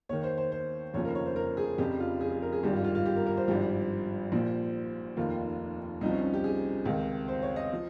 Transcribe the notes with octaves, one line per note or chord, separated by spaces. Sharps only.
D#2 D#3 C#5
C5
C5
C5
F1 D#2 C#3 F3 C#5
A#4
C#5
C5
A#4
G#4
F1 F2 C#3 G4
F4
G#4
G#4
A#4
G#4
G#1 G2 D#3 G4
F4
F4
F4
G4
A#4
A#4
C5
G#1 G2 F3 G4
A#1 A#2 F3
F1 D#2 D#3 F4
C2 C3 F3 D#4
C#4
C#4
G4
G#4
C#2 C3 D#3
C5
C#5
D#5
F3